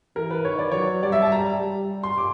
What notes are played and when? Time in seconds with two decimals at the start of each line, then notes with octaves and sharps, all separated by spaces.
0.16 E3 A#4
0.31 B4
0.45 D#3 C#5
0.59 D5
0.72 F#3 C#5
1.03 G3 D5
1.12 E5
1.22 A5
1.32 A#5
1.60 G3
2.03 C6
2.18 D6